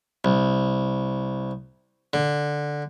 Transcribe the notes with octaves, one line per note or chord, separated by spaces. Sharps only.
C2
D3